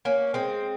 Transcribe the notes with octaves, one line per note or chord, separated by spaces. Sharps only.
A#3 C#4
G#3 C4